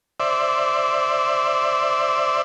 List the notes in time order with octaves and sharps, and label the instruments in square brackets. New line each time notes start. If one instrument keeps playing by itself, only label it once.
[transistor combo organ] C5 D5 E5